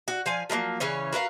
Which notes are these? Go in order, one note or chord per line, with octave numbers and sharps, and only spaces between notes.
F#4
F3 F5 G#5
F3 F#3 G#3 A#3
C#3 E3 C#4 C#5
F#4 A#4 B4 F5